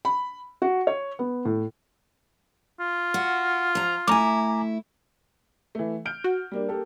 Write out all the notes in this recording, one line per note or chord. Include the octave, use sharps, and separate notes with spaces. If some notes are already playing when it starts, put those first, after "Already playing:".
B5
F#4
C#5
B3
A2
F4
F#4
F3 A#5
A3 E4 G#5 A#5 D6
E3 A3
F6 G6 D7
F#4
G3 A#3 D4
A#3 G4 A4